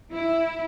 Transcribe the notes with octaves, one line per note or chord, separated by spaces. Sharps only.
E4